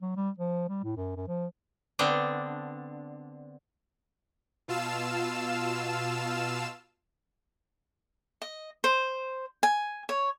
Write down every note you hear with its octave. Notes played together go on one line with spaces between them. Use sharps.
F#3
G3
F3
G3
A2
F#2
F#2
F3
D3 B3 C4 D4
B2 F4 F5 A5 E6 E7
D#5
C5
G#5
C#5